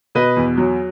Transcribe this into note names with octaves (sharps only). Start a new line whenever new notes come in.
B2 B4 D#5
E2
F#3